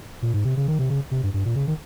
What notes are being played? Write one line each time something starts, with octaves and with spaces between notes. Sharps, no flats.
A#2
G#2
C3
C#3
D#3
C3
C#3
C3
G2
G2
A#2
C#3
D#3